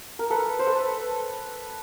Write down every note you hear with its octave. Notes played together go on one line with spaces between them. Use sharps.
A#4
A4 B4
C5
A4 B4